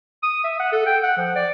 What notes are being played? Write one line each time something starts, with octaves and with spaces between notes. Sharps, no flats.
D#6
E5
F#5
A4
G5
F#5
F3
D5